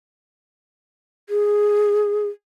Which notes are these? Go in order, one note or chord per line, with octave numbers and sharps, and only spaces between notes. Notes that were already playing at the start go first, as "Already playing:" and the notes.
G#4